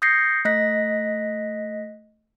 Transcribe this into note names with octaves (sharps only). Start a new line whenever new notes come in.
D#6 G6 A6 A#6 C7 C#7
A3 D#5 F#6 A#6 B6